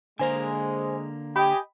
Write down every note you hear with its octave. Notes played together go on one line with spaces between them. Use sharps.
D3 G#3 A#3 A#4 C5 G#5
G4 D#5 G5 G#5 B5